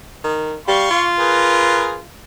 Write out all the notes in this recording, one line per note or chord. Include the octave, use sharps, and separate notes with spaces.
D#3
G3 F5 C6 C#6
F4
G#4 A#4 B4